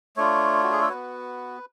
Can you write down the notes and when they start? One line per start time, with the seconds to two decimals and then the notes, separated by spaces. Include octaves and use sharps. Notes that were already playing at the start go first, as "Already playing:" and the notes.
0.17 A3 D4 F4 C#5
0.63 F#4
0.72 G#4
0.81 A4
0.89 B3 F#4 B4